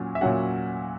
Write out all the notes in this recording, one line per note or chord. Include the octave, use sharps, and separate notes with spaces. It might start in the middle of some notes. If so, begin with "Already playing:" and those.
Already playing: A#2 F#3 C#4
E5
A#2 F#3 C#4 F#4 F#5